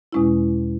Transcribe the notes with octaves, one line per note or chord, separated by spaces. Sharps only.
E2 B2 G#3 C#4 E4